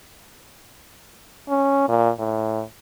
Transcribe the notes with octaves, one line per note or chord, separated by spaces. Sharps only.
C#4
A#2
A2